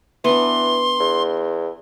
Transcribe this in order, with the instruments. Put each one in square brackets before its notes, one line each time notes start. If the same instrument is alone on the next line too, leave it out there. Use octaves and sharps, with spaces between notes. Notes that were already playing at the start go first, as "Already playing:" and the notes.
[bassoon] E3 [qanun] B3 D4 [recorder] C6
[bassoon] E2